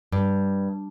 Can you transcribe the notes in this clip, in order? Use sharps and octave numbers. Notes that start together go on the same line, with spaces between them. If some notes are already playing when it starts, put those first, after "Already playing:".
G2